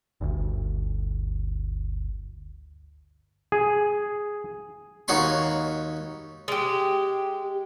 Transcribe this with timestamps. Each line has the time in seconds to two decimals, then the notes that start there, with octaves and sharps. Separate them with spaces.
0.21 G1 D2
3.52 G#4
5.08 D#2 D#4 F#4 C#5 B5 C6
6.48 G#3 G4